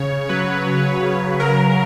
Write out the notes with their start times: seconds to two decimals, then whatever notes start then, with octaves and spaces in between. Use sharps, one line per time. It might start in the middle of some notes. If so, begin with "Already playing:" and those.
Already playing: C#3 C#5
0.29 F#3 B4
0.66 F#3
1.03 C#3
1.39 F#3 A#4